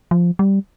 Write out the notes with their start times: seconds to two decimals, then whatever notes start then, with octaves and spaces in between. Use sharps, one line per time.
0.11 F3
0.39 G3